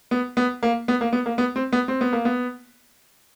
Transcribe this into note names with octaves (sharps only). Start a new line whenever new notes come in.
B3
B3
A#3
B3
A#3
B3
A#3
B3
C4
B3
C4
B3
A#3
B3